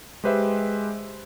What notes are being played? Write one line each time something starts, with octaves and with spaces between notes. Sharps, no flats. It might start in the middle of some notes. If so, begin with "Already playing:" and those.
G#3 G4 B4 C5 E5